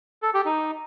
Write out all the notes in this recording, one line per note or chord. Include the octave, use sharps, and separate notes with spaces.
A4
G4
D#4